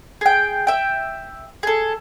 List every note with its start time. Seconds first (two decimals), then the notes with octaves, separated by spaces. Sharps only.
0.21 G#4 G5
0.67 E5 G5
1.63 G#4 A4